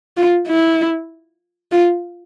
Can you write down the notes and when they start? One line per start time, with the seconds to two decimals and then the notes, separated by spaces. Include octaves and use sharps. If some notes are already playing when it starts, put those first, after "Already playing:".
0.17 F4
0.48 E4
1.72 F4